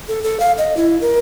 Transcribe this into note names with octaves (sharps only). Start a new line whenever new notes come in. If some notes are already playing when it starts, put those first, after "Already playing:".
A4
A4
F5
D#5
E4
A#4